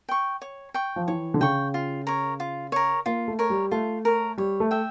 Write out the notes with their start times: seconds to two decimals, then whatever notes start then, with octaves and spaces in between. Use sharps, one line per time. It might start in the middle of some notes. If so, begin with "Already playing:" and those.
0.09 G5 C#6
0.42 C#5
0.74 G5 C#6
0.96 F3
1.08 E3 C#5
1.34 D3
1.40 C#3 G5 C#6
1.74 F4
2.07 A#4 C#5
2.40 F4
2.72 A#4 C#5
3.06 A#3 F4
3.28 A3
3.39 A#4 C#5
3.50 G3
3.71 A3 F4
4.05 A#4 C#5
4.38 G3 C#5
4.60 A3
4.71 E5 G5